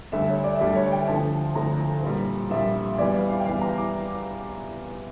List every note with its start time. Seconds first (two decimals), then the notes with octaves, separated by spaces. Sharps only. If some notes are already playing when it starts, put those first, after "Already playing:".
0.12 D2 D3 G3 E5
0.29 C#5
0.44 D5
0.56 E5
0.60 D2 D3 G3 D5
0.75 C#5
0.92 G5
1.07 D2 D3 F3 A5
1.55 D2 D3 F3 A#5
2.03 A#1 A#2 G3
2.50 A#1 A#2 G3 E5
2.98 E2 E3 G3 D5
3.14 F5
3.30 F5
3.40 G5
3.46 E2 E3 G3 F5
3.61 A#5
3.78 D6